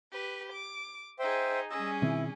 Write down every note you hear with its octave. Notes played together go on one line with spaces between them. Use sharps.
G4 B4
D6
D#4 G#4 C5 E5 G5
G3 C#4 G#4 D#5 E6
B2 D#3 C4 E4